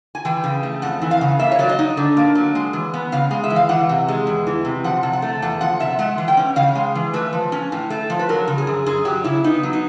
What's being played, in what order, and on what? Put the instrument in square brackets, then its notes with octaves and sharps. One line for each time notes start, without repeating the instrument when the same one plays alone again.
[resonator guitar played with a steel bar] G#5
E3 G5
C#3
A3
F2 F#5
E3
F5
C#3
A#3 E5
C#5
F#3 D5
D#5
D#4
D3
A#3
F#3
G#3
E3
B3
C#3 F5
G#3
E5
E3
F5
E3 F#5
C3
G#3
E2
E3
C3
F3 F#5
C3
F#5
A3
E2 F#5
F3 F#5
C3 E5
G#3 F#5
E3
G5
C#4
C#3 F5
G#3
E3
A3 B4
F3
C#4
A2
A3
F3
B4
F#3 A#4
C#3
G#4
F#2
F#2 G#4
F#3 G4
C#3 E4
B3 D#4
F#3
D#4